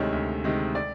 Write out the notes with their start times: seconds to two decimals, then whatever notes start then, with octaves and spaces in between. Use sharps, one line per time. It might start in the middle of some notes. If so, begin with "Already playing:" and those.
Already playing: D2 C3 D#3 G#3 C#5
0.12 D2
0.44 C3 D#3 G#3
0.75 D5